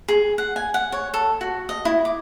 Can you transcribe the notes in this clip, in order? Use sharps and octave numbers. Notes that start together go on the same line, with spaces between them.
G#4
F#5
G#5
F#5
C#5
A4
F#4
D#5
E4
D6